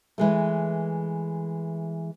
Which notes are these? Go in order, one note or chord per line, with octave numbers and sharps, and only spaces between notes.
E3 G#3 A3